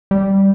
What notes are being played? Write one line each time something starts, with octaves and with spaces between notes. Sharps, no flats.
G3